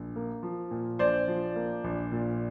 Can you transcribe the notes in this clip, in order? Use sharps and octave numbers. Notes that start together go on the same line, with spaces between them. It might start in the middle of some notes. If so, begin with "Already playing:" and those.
Already playing: A#1
A#3
F3
A#2
A#1 C5 D5
F3
A#3
A#1
A#2